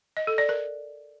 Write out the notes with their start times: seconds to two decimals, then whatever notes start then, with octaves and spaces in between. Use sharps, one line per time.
0.17 D#5
0.27 A4
0.38 D5
0.49 A#4